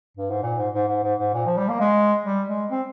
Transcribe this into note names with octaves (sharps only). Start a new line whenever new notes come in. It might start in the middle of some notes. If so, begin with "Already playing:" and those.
G2
G#2
A#2
G#2
G#2
G#2
G#2
G#2
A#2
F3
G3
A#3
G#3
G3
G#3
C4